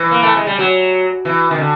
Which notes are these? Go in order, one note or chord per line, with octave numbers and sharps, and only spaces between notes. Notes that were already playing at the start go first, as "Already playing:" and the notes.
Already playing: E3
A#3
A3
G#3
G3
F#3
E3
D#3
D3